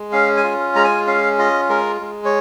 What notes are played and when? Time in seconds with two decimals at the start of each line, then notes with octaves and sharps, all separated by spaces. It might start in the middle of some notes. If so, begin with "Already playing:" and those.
Already playing: G#3
0.12 C#4 F5
0.37 G#5
0.44 F4
0.75 G#3 A#5
0.84 G#5
1.07 C#4 F5
1.38 F4 D#5
1.69 G#3 A#4
2.01 G#3
2.25 C#5